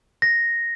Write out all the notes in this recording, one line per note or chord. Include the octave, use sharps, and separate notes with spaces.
A#6